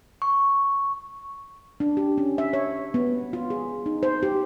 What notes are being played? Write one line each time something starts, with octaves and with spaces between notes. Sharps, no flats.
C#6
D4
G4
C#4
E5
C#5
B3
F4
G#4
D#4
C5
G4